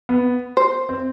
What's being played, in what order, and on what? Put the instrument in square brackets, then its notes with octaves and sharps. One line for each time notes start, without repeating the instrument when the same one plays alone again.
[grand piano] B3
[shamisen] C5
[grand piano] C4